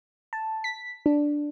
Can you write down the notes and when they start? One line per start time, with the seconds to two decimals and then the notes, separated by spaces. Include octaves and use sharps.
0.33 A5
0.64 B6
1.06 D4